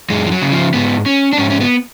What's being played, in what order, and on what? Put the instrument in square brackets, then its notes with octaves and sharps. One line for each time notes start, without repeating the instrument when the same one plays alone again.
[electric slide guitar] F#2 G#3
F3
F#3
C#3
F3
G#2 B3
C#4
D4
G#2 C#4
C#4
B3